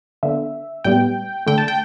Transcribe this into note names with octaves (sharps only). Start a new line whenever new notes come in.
D3 B3 E5
A2 G3 B3 G5
D3 A3 G5
A5
G5